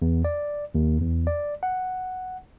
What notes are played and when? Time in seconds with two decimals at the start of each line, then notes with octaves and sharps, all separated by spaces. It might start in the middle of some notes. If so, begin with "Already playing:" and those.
0.02 E2
0.25 D5
0.75 D#2
1.01 E2
1.27 D5
1.63 F#5